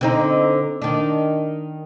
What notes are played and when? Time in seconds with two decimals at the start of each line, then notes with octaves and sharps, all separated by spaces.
0.01 D3 C4 D#4
0.82 D#3 D4